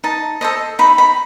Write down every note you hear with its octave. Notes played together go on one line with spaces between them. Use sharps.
D#4 A5
A4 C5 D#5
D#4 B5
B5